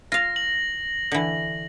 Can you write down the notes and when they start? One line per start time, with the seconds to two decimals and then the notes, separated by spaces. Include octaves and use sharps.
0.12 F4 F5 A#6
0.36 F#7
1.12 D3 E3